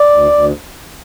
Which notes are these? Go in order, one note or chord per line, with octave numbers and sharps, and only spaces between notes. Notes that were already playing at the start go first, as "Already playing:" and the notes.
Already playing: D5
D2
D2